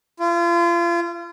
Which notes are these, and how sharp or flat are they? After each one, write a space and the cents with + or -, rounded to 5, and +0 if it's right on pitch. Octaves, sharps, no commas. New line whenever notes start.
F4 -35